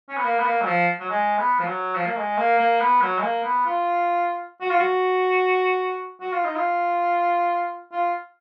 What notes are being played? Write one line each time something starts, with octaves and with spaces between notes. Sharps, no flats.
C#4
B3
A#3
B3
A#3
F#3
F3
F#3
G#3
B3
F3
F#3
F3
A#3
G#3
A#3
A#3
B3
F#3
G#3
A#3
B3
F4
F#4
F4
F#4
F#4
F4
D#4
F4
F4